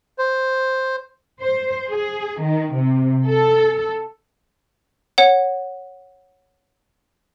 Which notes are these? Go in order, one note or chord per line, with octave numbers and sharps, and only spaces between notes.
C5
C5
G#4
D#3
C3
A4
C#5 F#5